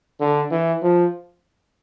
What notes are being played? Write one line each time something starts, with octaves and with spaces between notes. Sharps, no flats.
D3
E3
F3